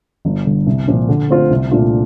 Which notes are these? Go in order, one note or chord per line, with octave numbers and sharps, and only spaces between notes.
G1
G2 D3
C2
A#2 F3
D3
A3 C4 F4 C5
C2
A#2 A3 D4 F4